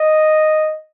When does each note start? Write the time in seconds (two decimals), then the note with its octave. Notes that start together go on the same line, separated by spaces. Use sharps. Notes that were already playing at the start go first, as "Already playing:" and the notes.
Already playing: D#5